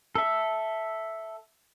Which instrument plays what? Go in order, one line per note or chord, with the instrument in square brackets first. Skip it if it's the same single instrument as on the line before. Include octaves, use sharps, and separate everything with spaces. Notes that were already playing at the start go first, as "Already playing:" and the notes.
[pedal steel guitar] A4 E5